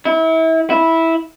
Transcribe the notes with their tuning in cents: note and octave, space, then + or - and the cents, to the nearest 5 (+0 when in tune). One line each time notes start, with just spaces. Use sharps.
E4 -30
E4 -10